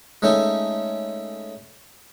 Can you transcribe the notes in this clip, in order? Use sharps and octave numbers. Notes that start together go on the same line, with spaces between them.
G#3 A3 C#4 D#4 A4